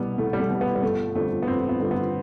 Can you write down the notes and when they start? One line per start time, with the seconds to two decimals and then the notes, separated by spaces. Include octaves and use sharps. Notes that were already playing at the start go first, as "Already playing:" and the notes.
Already playing: C2 B2 G3 B3
0.18 C2 A3
0.33 G3
0.40 A3
0.50 B2 G3
0.61 B3
0.75 G3
0.83 G1 A3
1.15 F2 D3 G3 A3
1.43 B3
1.47 G1 C4
1.69 B3
1.80 F2 D3 G3
1.91 B3